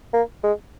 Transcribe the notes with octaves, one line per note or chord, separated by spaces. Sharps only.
A#3
G#3